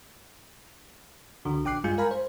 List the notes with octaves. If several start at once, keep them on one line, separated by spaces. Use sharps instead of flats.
C#2 D3 D#3 F#4
A#1 D4 G5 D6 F#6 C7
G2 G#3 F4 G#5 G6 C#7
A#4 F5 G#5 A#5 B5
C5